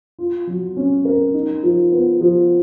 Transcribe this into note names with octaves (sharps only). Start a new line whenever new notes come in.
F4
F#3
C#4
A#4
D#4
F3
B3
F3